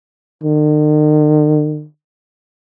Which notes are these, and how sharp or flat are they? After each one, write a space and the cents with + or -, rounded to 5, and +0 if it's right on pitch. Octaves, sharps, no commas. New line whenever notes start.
D#3 -45